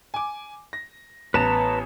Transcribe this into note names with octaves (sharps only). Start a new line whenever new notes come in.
G#5 D6
A#6
A1 B3 B4 A5 A#5 E7